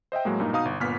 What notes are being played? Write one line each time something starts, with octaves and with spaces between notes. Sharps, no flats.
C5 D#5 E5 G5
A2 F#3 G#3 A#3
G2 A#2 A#3 D#4
B2 D#4 F5 A#5 D#6
G1
G1 A#2 B3 F6 B6